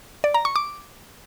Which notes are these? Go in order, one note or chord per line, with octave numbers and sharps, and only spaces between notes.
D5
A#5
C#6
D6